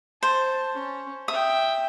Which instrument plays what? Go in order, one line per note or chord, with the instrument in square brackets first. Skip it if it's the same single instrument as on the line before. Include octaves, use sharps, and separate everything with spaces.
[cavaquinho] C5 [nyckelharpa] A5
[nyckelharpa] C#4
[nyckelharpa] E5 G5 [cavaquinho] D#6